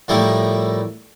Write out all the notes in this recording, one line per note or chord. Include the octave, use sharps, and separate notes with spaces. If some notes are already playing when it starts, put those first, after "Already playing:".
A2 F3 G3 A3 A#3 E4